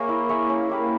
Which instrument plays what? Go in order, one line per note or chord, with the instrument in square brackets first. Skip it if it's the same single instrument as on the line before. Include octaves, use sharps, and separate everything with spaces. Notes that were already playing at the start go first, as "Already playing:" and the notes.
Already playing: [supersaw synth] A#3 [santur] G#4 C#5 E5
[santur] E4
G#4 C#5 E5
C#4
E4 G4 B4